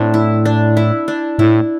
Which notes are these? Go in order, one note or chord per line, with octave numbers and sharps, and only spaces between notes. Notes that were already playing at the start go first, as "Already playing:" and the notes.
Already playing: A2 C4 D4
E4
D4
E4
D4
A2 E4